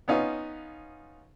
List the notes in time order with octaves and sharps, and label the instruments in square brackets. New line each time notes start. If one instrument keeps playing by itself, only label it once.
[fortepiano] B3 C#4 D#4 F4